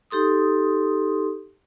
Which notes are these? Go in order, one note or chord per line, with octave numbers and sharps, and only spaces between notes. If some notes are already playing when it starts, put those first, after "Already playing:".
D#4 G4 A4 C6 D#6